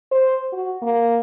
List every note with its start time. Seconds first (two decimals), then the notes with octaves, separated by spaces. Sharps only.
0.11 C5
0.52 F#4
0.82 A#3